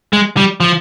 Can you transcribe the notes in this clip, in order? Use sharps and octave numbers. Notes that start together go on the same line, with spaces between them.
G#3
G3
F3